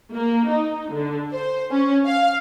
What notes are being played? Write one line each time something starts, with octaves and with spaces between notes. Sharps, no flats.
A#3
D#4
D3
C5
C#4
F5